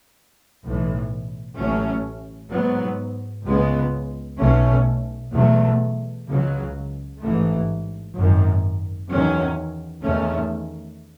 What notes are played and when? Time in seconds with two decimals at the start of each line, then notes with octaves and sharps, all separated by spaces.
0.63 B1 A2 E3
1.57 A1 A2 F#3 A3 C#4
2.51 G#2 F#3 B3
3.46 C#2 C#3 G#3 B3
4.39 B1 B2 A3 C#4
5.33 E2 B2 F#3 A3
6.27 C#2 C#3 F#3
7.21 A1 G#2 E3 A3
8.14 G#1 F#2 D#3
9.09 E2 D#3 F#3 C#4
10.02 E2 D#3 A3 C#4